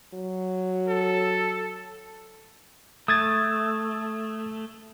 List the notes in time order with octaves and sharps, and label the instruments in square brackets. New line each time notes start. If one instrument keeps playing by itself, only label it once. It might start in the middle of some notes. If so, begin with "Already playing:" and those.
[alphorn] F#3
[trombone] A4
[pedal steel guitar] A3 [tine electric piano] D#6 G#6 A6